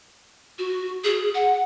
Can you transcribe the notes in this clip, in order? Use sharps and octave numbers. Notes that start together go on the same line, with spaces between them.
F#4
G#4
F#5